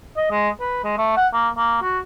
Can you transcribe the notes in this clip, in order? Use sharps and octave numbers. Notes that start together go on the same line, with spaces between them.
D#5
G#3
B4
G#3
A3
F#5
A#3
A#3
F#4